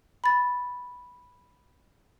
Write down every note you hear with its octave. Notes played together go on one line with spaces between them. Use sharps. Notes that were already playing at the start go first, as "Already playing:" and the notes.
B5 A6